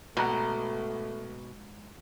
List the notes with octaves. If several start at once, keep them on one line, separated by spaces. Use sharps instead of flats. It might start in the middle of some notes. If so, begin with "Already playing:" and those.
A#1 G#2 B2 A3 F#5 A#5